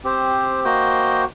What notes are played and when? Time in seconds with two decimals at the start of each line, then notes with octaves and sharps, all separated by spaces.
0.04 C4 G4 C5
0.64 A#3 F#4 C5 D#5 G5